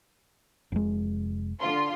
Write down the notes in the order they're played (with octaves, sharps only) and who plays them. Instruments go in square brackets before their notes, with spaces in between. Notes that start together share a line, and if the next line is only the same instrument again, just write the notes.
[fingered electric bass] F1 G#3
[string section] D3 F4 C6